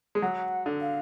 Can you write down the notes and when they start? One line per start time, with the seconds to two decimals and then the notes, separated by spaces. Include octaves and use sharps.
0.15 G#3
0.22 F#3 F#5
0.66 D3
0.81 F5